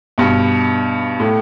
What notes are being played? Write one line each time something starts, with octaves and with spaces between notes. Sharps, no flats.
G2 B2
A2